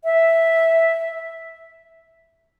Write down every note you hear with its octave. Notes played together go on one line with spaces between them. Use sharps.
E5